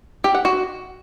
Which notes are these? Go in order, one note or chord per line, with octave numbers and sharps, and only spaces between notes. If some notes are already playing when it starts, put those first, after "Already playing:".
G4
F#5
F#4